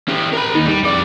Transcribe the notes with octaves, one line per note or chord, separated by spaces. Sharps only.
C#4 G4
A#4 B5
D#2 D#4
G3
F2 D5